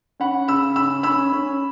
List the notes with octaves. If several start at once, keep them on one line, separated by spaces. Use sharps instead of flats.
C#4 F#5 B5
C#3 B5 E6
C#4 B5 E6
C#4 B5 E6
C#4